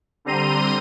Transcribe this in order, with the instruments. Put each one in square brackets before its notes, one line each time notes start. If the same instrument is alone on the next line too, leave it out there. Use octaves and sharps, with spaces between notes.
[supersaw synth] D3 G3 C4 A#5 C6 D#7